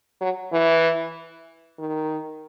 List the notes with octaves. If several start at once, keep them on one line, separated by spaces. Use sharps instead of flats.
F#3
E3
D#3